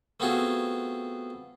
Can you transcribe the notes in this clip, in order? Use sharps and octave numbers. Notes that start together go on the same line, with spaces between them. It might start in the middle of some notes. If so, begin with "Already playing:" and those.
A3 B3 C4 F4 F#4 G#4